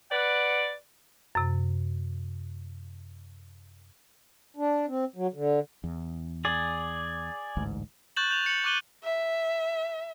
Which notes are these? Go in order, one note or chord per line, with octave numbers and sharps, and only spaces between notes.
B4 D5 F#5
F#2 C3
D4
C4
F#3
D3
E2
G#4 D5
A1 D2 G#2
C#6 F#6 G6 A6 E7 F#7
G6 F7
C#7 F#7
C#6 D6 F#6 D#7 F#7 G7
E5